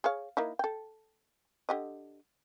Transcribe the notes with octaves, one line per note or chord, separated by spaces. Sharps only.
G#4 C#5 F5
A#3 D#4 E4
A4 G5
D3 G4 D#5